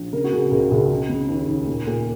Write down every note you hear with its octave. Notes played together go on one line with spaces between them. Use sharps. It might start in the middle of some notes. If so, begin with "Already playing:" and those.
Already playing: A#1
C#3 A#4
F#4
C#3 G#4
C#2 A#4
C#2 G#4
C#3
C#3
D#2
D#2
A#2
A#2